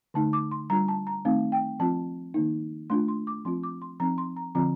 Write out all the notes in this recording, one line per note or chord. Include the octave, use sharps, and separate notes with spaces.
D3 A3 D#4 A5
D6
C6
G3 D4 F4 A#5
A5
A#5
D#3 A3 C4 D#4 F5
G5
F3 C4 F4 A5
D#3 A#3 D#4
A3 D4 F4 C6
C6
D6
F3 C4 F4 C6
D6
C6
F3 C4 D#4 A#5
C6
A#5
D3 F3 C4 F4 A#5